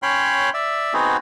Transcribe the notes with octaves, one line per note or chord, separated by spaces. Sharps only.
C#4 C#5 G5 B5 C6
D5 E5
B3 C4 D#4 F#4 G#4